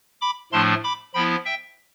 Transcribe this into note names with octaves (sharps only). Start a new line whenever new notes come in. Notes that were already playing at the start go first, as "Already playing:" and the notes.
B5 D6
A2 F3 A3 D4 A5 C6
B5 D6
F3 B3 E4 G5 B5
E5 G5